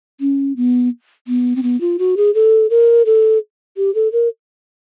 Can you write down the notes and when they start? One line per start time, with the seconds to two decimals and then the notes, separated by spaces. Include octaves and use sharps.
0.20 C#4
0.57 B3
1.28 B3
1.56 C4
1.63 B3
1.81 F4
1.99 F#4
2.17 G#4
2.35 A4
2.70 A#4
3.06 A4
3.77 G4
3.95 A4
4.12 A#4